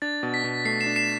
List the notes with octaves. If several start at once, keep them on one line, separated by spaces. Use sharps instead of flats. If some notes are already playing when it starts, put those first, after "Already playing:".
D4 A6
B2
B6
B2
A3 C7
C7 E7
D4
C7 E7